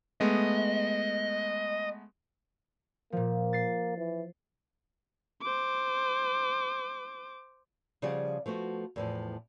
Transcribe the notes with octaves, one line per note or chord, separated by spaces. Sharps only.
G#3 A3 B3 D#5
A#2 F3 A#3
A6 C7
E3
C5 D6
C#3 F3 G3 G#4 D5 F#5
F3 A3 B3 F#4
E2 A2 F3